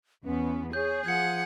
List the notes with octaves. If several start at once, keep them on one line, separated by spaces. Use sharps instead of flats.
E2 B3 C#4
G#4 C#5 G6
F3 F#5 G#6 C#7